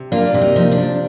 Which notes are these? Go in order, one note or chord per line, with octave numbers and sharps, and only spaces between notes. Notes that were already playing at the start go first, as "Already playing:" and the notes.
Already playing: C3
A#3 D4 F4
C3
D#4
F3
D4
C3